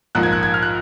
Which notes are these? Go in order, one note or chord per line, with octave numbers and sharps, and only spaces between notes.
A#1 G#2 F3 A#3 F#6
G#6
F#6
G#6
F6
F#6